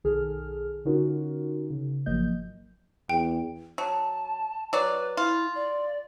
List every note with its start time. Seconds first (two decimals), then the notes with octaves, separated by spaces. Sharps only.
0.04 B1 D#3 G#4 A4 F6
0.85 D3 C#4 D#4 F4 F#4 A#4
1.70 C#3
2.06 G#1 F3 F#3 A#3 D#5 G6
3.10 E2 G5
3.78 F#3 A5
4.73 F#3 B4 D5
5.17 E4 F4
5.55 D5